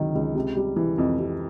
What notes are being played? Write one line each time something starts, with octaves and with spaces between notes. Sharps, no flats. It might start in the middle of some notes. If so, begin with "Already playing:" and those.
Already playing: C#2 C3 D#3 F#3
C#2
C3
G3
E3
F2
C3